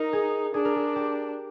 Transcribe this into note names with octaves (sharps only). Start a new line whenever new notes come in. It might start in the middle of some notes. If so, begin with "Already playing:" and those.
Already playing: D#4 A#4
G#4
D4 G#4
A#4
G#4
G4